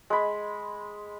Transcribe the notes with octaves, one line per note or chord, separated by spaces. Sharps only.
G#3 B5